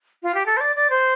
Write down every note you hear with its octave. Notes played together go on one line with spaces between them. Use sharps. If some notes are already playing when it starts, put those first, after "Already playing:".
F4
G4
A4
C5
D5
D5
C5